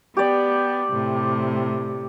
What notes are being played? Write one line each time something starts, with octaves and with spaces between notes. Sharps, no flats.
B3 G4 D5
A2 C3